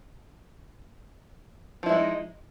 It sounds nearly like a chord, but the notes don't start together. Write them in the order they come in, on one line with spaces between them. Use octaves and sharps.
F3 E4 G#3 D#4